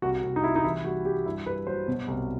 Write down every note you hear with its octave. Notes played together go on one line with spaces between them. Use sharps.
C2 F#4
C2
D#4
G3 E4
D#4
E3 E4
G3 F#4
G3 G4
G2 E4
G2 B4
F#3 C5
B2
C2